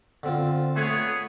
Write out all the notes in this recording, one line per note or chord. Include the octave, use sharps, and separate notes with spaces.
D3 C4 F4
A3 B3 G#4 C#5